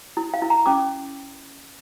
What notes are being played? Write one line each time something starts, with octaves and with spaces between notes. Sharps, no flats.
E4
F5
E4
A#5
C#4 D6